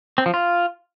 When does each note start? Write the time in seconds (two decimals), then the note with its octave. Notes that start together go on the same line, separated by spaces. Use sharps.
0.18 C4
0.26 F3
0.34 F4